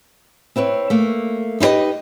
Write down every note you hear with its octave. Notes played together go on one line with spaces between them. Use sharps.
C4 E4 B4 C#5
A3 A#3
D#4 E4 G4 B4 D#5